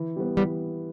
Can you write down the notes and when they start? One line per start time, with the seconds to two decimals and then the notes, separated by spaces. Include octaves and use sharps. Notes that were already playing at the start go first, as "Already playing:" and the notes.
Already playing: E3
0.16 G3 B3
0.37 E3 G3 B3